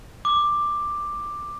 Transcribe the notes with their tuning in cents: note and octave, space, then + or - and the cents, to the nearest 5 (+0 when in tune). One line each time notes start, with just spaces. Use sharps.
D6 +10